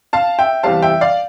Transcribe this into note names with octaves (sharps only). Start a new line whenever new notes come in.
F5 A5
E5 G5
E2 C3 G3 C4 F5 A5
E5 G5
D5 F5